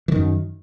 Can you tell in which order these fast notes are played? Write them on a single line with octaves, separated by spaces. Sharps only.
E3 D#3 F#2